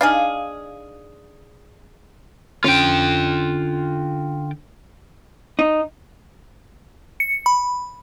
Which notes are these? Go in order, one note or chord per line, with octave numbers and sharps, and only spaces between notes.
D4 D#4 G#4 F5
D3 C#4 F4 G5
D#4
C#7
B5